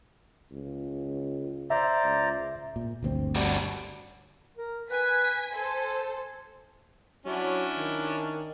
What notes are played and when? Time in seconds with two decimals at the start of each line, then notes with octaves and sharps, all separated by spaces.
0.51 C#2
1.70 C5 D5 E5 A#5
2.04 C#2
2.76 A#2
3.03 G1 D2 C4
3.36 G3 D4 F#4
4.57 A#4
4.90 B4 G#5 B6
5.54 A4 C5 G#5
7.26 F#3 C#4 D4 E4
7.77 D#3